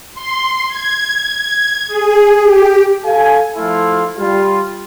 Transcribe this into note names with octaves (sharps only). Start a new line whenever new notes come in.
C6
G#6
G#4
G4
A4 F5 G#5
F3 A3 E4 F4
G3 F4